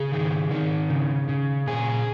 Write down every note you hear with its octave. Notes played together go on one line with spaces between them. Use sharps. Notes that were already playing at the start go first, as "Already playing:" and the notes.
Already playing: C#3 G#4
D#3
D#3
C#3
C#3
A#2 G#4